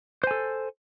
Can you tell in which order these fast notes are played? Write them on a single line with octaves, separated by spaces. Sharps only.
C5 G#5 A4